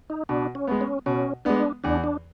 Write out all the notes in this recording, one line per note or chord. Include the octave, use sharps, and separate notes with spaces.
D#4
B2 D4
C#4
G#3 B3
C#4
B2 C#4
G#3 B3 D4
E2 D4
D4